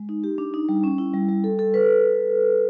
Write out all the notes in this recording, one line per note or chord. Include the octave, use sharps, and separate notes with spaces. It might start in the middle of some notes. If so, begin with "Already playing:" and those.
Already playing: G#3
D#4
G4
D4
D#4
G3
C#4
E4
G3
G3
A4
A4
B4